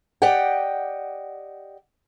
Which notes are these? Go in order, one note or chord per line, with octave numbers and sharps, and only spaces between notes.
G4 D5 D#5 F#5 G5